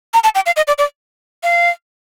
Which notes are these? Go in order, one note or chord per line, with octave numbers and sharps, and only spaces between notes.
A#5
A5
G5
F5
D#5
D5
D5
F5